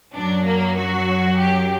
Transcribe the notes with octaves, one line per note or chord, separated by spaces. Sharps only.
F#2 F#3 D4
A#3
F#4
G4